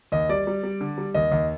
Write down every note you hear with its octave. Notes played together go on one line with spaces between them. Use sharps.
D#2 D#5
G3 D5
G3
G3
D3
G3
D#2 D#5
D#2